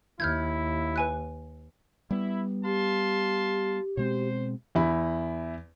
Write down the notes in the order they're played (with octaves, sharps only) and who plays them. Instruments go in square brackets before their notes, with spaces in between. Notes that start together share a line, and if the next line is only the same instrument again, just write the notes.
[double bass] D#2 [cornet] E4 [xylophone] F6 G6 G#6
[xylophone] B4 G#5 F#6
[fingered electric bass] G3 B3 [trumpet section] E4
[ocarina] G4 [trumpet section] F5 A5 C6
[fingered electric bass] B2 G#3 C4 [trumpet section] C5
[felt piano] E2 E4 B5